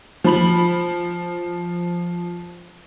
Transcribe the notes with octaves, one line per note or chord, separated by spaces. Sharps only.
F3 B5 F#7